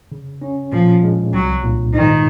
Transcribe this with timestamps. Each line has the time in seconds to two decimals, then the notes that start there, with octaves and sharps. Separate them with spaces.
0.12 C#3
0.42 C#4
0.72 A#2 F3
1.03 G#3
1.33 C2 F#3
1.63 A#2
1.93 G#2 D#3